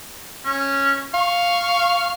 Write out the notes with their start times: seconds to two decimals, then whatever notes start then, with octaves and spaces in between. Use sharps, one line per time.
0.45 C#4
1.14 F5 C#6